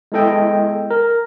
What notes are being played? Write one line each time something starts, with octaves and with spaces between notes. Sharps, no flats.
G#3 B3 E4 A4 D#5 G5
A#4